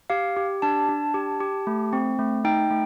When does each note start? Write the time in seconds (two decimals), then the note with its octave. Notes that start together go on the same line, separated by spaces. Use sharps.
0.10 G4 F5
0.36 G4
0.62 D4 A5
0.89 D4
1.14 G4
1.40 G4
1.67 A3
1.93 C4
2.19 A3
2.44 D#4 G5
2.71 A3